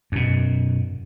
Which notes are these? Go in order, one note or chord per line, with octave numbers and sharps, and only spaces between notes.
F#2 B2